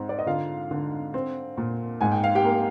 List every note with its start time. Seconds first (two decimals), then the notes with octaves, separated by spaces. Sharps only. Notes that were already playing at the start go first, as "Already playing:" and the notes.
Already playing: G#2 C4
0.09 D5
0.19 D#5
0.26 D3 F4 F5
0.71 D3
1.14 C4
1.57 A#2
2.01 G#2 G#5
2.12 G5
2.24 F5
2.35 G4 G5
2.45 A#3